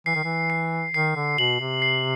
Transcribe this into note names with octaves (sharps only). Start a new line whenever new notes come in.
E3 C7
D#3
E3
C7
D#3 C7
D3
B2 F#7
C3
C7